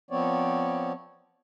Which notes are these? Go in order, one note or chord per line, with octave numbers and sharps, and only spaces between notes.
F3 B3 C4 C#5 D5